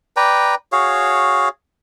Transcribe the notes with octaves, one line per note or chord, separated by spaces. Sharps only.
B4 D5 G5 A#5
F#4 G#4 C#5 F5